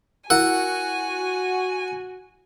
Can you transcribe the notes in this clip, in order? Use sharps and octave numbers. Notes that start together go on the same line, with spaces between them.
E4 F#4 A#4 F#5 G#5